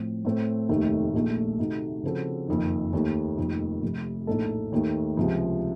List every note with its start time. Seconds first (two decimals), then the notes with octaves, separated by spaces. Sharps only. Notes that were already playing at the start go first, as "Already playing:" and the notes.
Already playing: A2 F3 C4
0.25 A2 A3 C4
0.69 F1 D#2 D#3 A3
1.14 A#1 A#2 A3 D#4
1.59 C3 D#3 A3 D#4 F#4
2.03 C#3 F3 C4 F#4 A4
2.48 F#1 F2 D#3
2.93 D#2 D#3 A3
3.38 F1 F2 D#3 A#3
3.82 F1 F2 C3
4.27 A#1 A2 A3 D#4 A4
4.72 D#2 D#3 A3
5.17 C#2 C3 F3